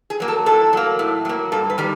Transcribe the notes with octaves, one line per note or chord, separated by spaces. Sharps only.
G#4
F#3 A#3
A4
A2 A4
F#3 A#3
A2
F#3 A#3
G2 A4
B4
D#3 G3